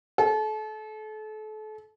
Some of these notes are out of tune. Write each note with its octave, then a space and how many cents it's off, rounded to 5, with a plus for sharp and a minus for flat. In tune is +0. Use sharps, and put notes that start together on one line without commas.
A4 -35